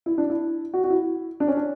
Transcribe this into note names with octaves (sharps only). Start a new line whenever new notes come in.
E4
D4
E4
F#4
F#4
E4
D4
C#4
D4